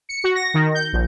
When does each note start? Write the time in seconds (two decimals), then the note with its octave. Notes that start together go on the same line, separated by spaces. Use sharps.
0.09 C#7
0.24 F#4
0.35 A#6
0.54 D#3
0.75 G6
0.93 A#1